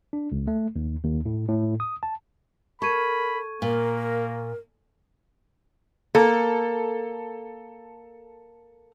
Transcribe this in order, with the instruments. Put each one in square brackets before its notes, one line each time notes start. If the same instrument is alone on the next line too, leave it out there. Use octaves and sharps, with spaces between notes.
[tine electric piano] D4
C#2
A3
D#2
D#2
A2
A2
D#6
A5
[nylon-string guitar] A4 [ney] A#4 [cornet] B5 [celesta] C#6 G#6 D#7
[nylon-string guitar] A#2 [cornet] A#3 [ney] A#4
[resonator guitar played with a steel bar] A#3 [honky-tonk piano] A4